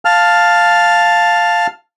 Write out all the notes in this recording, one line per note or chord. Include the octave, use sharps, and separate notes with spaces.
F5 A5 F6